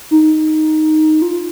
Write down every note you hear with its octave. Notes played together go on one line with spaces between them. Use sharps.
D#4
F4